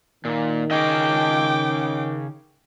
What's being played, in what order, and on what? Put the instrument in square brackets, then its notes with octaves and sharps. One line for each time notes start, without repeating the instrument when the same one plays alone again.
[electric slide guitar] A#2 [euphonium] D#3
[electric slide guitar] C#3 C#4 D#5 [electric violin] G5 D6